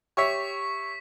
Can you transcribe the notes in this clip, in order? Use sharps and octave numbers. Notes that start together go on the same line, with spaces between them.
G4 C#5 E5 C#6 B6